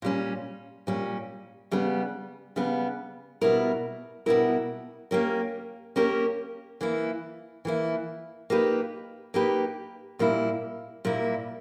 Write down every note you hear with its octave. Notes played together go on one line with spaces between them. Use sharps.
A#2 G3 C#4
A#2 G3 C#4
C#3 G3 B3
C#3 G3 B3
B2 G3 B3 E4 A#4
B2 G3 B3 E4 A#4
A#3 C#4 G4 A#4
A#3 C#4 G4 A#4
E3 A#3 E4
E3 A#3 E4
A#3 D#4 G4 B4
A#3 D#4 G4 B4
A#2 G3 A#3 E4
A#2 G3 A#3 E4